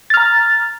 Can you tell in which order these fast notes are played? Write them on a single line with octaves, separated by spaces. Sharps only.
A6 F6 A#5